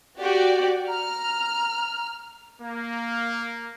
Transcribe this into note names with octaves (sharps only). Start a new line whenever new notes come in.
F#4 G4 D5
A#5 F6
A#3